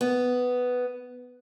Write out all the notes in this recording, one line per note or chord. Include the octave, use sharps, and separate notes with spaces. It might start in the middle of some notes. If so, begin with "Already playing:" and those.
B3